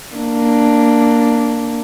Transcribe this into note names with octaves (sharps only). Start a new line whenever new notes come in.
A#3 D4